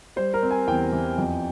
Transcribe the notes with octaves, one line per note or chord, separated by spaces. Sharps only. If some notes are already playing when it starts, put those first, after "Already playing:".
G3 C5
A#4
C4
G#5
E2 G5
E3
F2